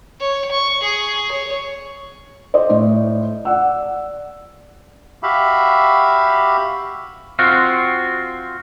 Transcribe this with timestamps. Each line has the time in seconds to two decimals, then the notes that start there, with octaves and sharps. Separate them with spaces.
0.20 C#5
0.51 C#6
0.83 G#4
1.32 C#5
2.54 C5 D5 D#5
2.70 A2
3.45 D5 F#5 E6
5.23 F#4 G4 E5 F5 B5
7.39 C4 F4 F#4